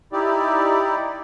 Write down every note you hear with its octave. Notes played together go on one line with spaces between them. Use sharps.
D#4 E4 G4 D5